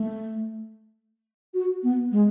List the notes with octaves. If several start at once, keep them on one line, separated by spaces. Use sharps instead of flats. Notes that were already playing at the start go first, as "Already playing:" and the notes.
Already playing: A3
F#4
B3
G#3